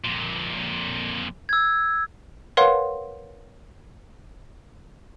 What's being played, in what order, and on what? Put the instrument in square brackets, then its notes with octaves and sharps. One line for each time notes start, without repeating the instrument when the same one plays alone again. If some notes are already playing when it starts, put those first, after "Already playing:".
[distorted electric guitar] F2 A#2
[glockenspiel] E6 G#6
[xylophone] A#4 B4 C#5 F5 F#5 C6